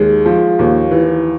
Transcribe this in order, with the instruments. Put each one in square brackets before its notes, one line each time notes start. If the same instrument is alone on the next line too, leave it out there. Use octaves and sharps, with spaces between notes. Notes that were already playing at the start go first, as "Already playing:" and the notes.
Already playing: [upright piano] D#2 G#3
F3
D#2
E3